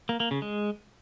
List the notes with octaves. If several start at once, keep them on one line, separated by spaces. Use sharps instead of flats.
A#3
A#3
C#3
G#3